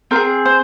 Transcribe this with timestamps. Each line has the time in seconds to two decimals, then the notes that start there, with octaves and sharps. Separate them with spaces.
0.11 C4 F4 A#4
0.16 G#4
0.45 C5